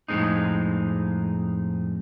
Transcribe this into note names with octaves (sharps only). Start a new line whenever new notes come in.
F2 A2 G#3 C4 D#4